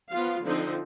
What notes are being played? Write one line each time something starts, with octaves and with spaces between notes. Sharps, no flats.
F3 B3 F4 F5
D3 F3 C4 D#4